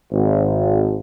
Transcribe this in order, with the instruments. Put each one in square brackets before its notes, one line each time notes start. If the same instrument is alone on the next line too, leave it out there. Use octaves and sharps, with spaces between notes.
[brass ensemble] G#1